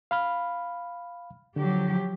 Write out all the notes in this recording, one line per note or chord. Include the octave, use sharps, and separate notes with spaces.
F5 B5 F6
D3 F3 F#3 G4